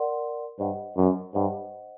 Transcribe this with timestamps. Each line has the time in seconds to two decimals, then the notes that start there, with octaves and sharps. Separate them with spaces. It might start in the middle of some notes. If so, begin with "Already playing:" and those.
Already playing: A#4 D5 F#5 C6
0.59 G2 C5 D#5 F#5
0.97 F#2
1.34 G2 C5 D#5 F#5